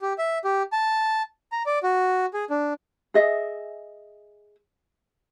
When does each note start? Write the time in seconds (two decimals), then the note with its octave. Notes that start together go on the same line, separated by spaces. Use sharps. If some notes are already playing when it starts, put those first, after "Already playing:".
0.02 G4
0.18 E5
0.45 G4
0.72 A5
1.52 A#5
1.66 D5
1.83 F#4
2.34 G#4
2.50 D4
3.14 G#4 D#5 E5